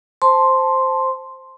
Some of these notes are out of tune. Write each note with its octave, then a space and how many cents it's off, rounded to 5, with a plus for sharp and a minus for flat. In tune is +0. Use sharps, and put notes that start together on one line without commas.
C5 +0 A5 +0 C6 +0